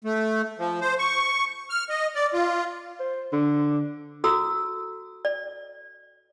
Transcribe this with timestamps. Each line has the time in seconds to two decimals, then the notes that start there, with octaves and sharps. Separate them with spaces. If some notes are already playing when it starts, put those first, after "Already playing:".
0.04 A3
0.59 F3
0.81 C5
0.99 C#6
1.70 F6
1.89 D#5
2.15 D5
2.33 F4
3.00 C5
3.33 D3
4.24 F#4 A4 A#5 E6
5.25 D5